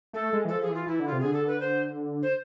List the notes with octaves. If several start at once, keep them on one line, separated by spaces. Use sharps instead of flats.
A3 A4
G#3
E3
F3 A4
G#4
E3
F4
E3 E4
D3
F4
C3
D3 G#4
A4
B4
C5
C5